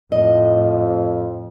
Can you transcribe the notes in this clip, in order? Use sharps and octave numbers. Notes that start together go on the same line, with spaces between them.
F2 A2 D#5